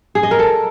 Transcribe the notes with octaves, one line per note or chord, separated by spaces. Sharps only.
G#4
D#5
A#4
A4